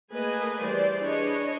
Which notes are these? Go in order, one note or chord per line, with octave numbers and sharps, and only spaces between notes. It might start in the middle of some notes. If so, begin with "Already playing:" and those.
A3 A#3 G#4 B4 D#5 G#5
E3 G3 C5 D5
D4 G#4 B4 C#5 D#5